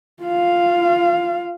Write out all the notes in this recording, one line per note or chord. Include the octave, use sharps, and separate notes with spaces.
F4 F5